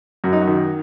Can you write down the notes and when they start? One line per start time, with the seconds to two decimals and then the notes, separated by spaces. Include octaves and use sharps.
0.24 F#2 F#4
0.33 D#4
0.41 F#4
0.47 D#3